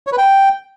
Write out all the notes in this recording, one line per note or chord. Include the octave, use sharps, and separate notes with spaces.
C#5
B4
G5